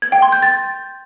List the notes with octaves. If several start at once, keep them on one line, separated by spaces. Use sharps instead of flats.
G#6
G5
C6
G6
A6